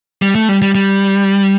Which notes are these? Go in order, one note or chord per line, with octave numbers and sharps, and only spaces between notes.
G3
A3
G3
G3
G3